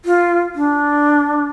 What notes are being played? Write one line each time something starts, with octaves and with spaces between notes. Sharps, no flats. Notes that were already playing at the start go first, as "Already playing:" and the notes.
F4
D4